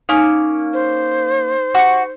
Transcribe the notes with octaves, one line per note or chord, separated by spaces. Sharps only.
A#3 C#4 D#4 G#5
C5
F#4 C#6